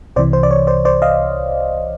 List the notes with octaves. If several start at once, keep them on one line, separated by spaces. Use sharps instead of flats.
C2 C3 E3 C5 D5
C5
D5
C#5
C5 D5
C5 D5
D#5 F5